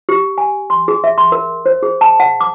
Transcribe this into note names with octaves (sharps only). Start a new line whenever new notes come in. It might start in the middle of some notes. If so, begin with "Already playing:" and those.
G4
G#5
C6
G#4
E5
C6
A#4
C5
G#4
A5
F#5
D6